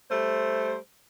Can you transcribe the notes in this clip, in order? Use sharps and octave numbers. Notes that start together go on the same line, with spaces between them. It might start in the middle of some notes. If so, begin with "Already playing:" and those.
G3 A3 C5